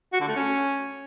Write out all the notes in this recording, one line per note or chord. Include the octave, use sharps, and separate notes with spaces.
F#4
D3
A3
C#4